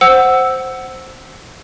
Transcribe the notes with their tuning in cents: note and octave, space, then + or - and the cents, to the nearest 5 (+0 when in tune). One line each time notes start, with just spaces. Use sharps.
C5 +0 F#5 +10 E6 +0